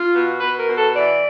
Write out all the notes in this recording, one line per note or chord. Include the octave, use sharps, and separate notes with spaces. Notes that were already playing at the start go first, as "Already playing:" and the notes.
Already playing: F4
B2
B2 B4
A#4
B2
A4
E3 D5